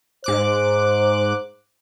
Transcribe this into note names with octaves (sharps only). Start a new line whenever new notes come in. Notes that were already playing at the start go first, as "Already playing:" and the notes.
G#2 C5 D6 F#6